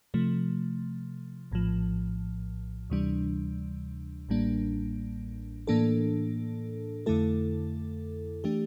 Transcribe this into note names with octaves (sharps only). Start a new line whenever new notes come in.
C3 F3 A3
A#1 A2 F3
D2 C3 E3 G3 D4
A1 A2 G3 A#3 D4
A2 E3 A#3 D4 A4
F2 D3 A3 E4 A4
E3 A3 D4 G4